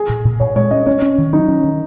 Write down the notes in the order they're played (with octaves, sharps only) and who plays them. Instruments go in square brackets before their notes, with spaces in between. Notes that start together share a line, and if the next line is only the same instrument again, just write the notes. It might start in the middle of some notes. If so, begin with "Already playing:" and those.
Already playing: [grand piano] G#4
[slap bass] A#2
A#2
[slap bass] A#2 [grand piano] C#5
[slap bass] G#3 [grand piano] C#5
[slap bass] C#4 [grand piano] D#5
[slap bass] C#4 [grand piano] C#5
[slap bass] C#4
D#3
[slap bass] F#3 [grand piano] D#4
[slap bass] C#4
D#3